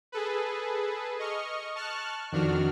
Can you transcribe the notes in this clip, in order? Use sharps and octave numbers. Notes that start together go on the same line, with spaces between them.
G#4 A4 B4
D#5 C#6 F6
A5 C#6 F6 F#6
F2 D#3 D4 F#4 F6